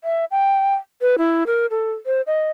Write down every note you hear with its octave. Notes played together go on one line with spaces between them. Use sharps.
E5
G5
B4
E4
A#4
A4
C5
D#5